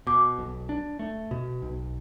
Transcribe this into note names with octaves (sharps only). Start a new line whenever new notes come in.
B2 D6
B1
D4
A3
B2
B1